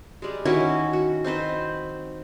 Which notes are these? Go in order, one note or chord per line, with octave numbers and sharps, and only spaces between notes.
G3 G#3
D#3 C#4 E4 F#4
F#4
C4 D#4 B4 C5